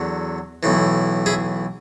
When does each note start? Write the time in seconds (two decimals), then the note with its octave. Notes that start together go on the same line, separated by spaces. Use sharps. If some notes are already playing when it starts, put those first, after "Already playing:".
Already playing: E2 D3 F#3
0.63 B1 A2 E3
1.26 E4 G#4